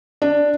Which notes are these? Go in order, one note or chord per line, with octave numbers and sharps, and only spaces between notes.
D4